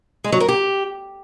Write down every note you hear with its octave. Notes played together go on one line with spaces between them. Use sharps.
G#3
F#3
A#4
G4